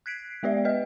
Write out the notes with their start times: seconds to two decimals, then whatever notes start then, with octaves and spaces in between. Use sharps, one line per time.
0.06 F#6 G#6 B6 C7 D7
0.43 G#3 B3 G4 D5 E5
0.65 B4 D#5 F6